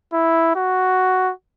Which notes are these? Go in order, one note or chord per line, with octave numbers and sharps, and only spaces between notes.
E4
F#4